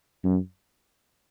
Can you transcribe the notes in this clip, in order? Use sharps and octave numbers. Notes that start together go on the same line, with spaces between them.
F#2